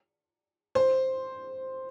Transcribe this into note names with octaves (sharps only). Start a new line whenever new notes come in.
C5